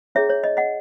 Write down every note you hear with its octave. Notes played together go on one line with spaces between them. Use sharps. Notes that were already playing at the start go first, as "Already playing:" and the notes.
C#4 E4 G#4 C#5 E5
C#5
D#5
D#5 F#5